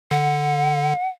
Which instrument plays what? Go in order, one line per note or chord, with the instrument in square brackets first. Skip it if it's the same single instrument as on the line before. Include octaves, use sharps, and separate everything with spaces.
[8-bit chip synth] D3 [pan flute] F#5